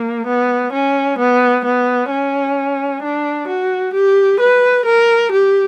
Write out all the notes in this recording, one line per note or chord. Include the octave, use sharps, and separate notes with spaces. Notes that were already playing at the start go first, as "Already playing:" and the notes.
Already playing: A#3
B3
C#4
B3
B3
C#4
D4
F#4
G4
B4
A#4
G4